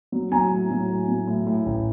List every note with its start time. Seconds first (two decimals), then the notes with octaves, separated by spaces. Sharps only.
0.12 F#3
0.32 F#3 G#5 A#5
0.51 A2
0.70 F#3
0.89 A2
1.08 F#3
1.27 A2
1.47 A2
1.66 A1